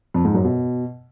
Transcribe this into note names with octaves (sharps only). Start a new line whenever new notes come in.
F2
G#2
F#2
B2